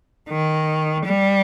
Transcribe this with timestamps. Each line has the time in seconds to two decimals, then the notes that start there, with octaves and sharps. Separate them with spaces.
0.29 D#3
1.05 G3